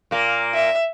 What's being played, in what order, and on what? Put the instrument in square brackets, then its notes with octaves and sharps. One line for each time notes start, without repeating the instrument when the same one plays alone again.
[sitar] A#2 A#3
[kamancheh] E5